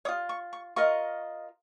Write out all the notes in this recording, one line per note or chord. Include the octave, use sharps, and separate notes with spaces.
C#5 D#6
F4
C#6
C#6
F4 A#4 D#5 C#6